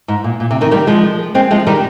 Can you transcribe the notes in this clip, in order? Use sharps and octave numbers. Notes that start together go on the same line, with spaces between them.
G#2
A#2
A#2
C3
C3 D#3
D#3 G3
F3 G#3
G#3 C4
F3 G#3
D#3 G3